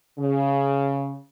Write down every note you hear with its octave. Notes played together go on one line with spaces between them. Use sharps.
C#3